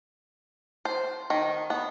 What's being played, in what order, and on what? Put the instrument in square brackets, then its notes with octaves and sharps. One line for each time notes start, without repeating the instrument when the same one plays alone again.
[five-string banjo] C5
D#3
B3